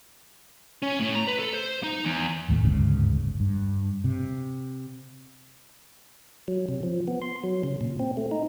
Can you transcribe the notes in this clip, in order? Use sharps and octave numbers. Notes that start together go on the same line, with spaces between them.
C#4
A2
A#5
B4
A4
C5
D#4
E2
A1 D#2 A2 A3
G1 D2 G#2 C#3
G2
C3
F#3
C3
F3
B3
C6
F#3
C#3
A#2
C4
A3
D#4